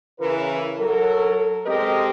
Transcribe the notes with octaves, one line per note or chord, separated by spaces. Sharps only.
C#3 E3 A#4 B4
F#3 A4 A#4
G#3 C4 G4 A4 A#4 D#5